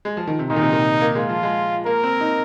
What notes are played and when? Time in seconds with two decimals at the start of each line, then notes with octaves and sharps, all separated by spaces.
0.05 G#3
0.17 F3
0.27 D#3
0.39 C3
0.50 A#2 D#4
0.56 D#3
0.61 C3
0.73 D#3
1.01 A#3
1.15 G#3 F4
1.29 F3
1.43 G#3
1.86 A#3 A#4
2.03 C4
2.21 D#4